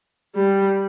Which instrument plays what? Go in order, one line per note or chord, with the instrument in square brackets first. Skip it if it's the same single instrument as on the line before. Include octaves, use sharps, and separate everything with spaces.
[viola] G3